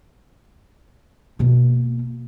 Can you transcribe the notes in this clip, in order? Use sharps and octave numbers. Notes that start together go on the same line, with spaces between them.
B2 A#3